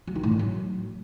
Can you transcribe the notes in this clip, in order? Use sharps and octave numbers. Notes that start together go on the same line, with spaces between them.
F#3
D#3
A2
F3
F#3